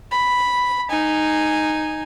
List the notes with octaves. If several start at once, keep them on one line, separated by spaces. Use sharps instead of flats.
B5
D#4 G#5